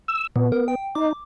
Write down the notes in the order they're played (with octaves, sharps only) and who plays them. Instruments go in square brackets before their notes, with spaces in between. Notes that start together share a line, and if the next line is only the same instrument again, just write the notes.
[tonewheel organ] E6
[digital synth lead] A#2 [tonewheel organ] B3
[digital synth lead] A#4
G5
[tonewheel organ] D#4 [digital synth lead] D6